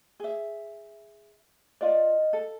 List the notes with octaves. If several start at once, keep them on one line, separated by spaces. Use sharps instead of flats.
G#4 E5
F4 D5 D#5 F5
A4